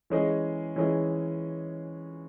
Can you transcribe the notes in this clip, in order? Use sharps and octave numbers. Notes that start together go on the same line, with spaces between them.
E3 G#3 C#4 G#4 D#5
E3 G#3 C#4 G#4 D#5